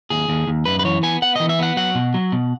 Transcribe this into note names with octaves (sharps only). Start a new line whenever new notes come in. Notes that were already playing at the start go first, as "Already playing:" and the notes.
D#2 G#4
D#2
D#2
F#2 B4
B4
E3 C#5
B3 G#5
B3 F#5
E3 D#5
E5
B3 F#5
F#3 F#5
B2
F#3
B2